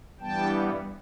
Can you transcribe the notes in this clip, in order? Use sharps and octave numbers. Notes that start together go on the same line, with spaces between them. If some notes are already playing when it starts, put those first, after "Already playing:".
G2 E3 G3 B3 G5 A5